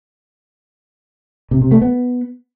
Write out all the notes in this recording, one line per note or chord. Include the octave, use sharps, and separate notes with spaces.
C3
C3
A3
B3